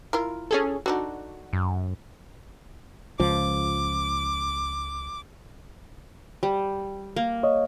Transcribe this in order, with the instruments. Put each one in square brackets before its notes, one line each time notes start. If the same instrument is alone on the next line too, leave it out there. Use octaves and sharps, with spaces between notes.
[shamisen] E4 F4 A#4
[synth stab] C#4 G#4 A4
[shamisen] D3 D4 D#4 [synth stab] F#4
[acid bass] F#2
[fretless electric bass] C#2 F3 [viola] D6
[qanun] G3
A#3
[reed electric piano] C#5 D#5